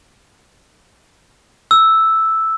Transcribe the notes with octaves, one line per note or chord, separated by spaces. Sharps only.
E6